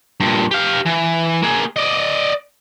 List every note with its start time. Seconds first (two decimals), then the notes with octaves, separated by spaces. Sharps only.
0.20 G2 A#2
0.51 G4 F5
0.86 E3
1.43 A#3 G#4
1.76 D5 D#5